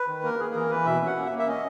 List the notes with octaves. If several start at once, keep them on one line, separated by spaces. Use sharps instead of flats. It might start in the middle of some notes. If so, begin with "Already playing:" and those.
Already playing: B4
D#3
A#3 A#4
A#3 G#4
E3 A#4
E3 B4
B2 E5
C#4
F#5
A#3
E5
A#3
E5
C#4 D#5